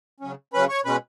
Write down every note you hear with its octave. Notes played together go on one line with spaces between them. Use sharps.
C#3 F#3 C#4
C#3 F#3 C#4 B4 B5
C#5 C#6
B2 G#3 C#4 B4 B5